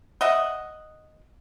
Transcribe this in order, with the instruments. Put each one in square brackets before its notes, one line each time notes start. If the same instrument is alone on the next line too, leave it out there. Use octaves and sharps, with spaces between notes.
[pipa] D#5 E5 F#5